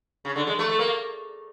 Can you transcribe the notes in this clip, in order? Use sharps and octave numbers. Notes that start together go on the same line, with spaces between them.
C#3
D3
G#3
A3
A3
A#3